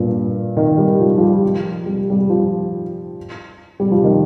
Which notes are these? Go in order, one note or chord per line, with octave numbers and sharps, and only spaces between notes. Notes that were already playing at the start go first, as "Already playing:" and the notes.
Already playing: G2 A#2
D#3
G3
F3
F3
G3
F3
G3
G3
F3
G3
F3
D#3